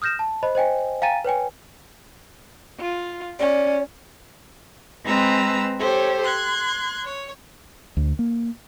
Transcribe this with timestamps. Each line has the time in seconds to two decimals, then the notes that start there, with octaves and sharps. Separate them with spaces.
0.02 D#6 F6 G6 A#6 E7
0.19 A5
0.43 C5 D#5 B5
0.55 C5 D#5 G5 G#5
1.02 F5 G5 G#5 A#5 A6 D#7
1.25 B4 C#5 G5 G#5
2.80 F4
3.39 C#4 D5
5.04 G#3 C4 B4 A#5 E6
5.79 G4 A4 C5 C#5
6.22 C6 F#6 G#6
7.04 C#5
7.97 D2
8.19 A#3